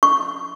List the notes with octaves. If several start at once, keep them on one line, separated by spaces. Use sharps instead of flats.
C#6